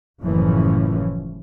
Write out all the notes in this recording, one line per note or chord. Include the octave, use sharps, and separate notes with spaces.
F#1 A2 E3 F3 C#4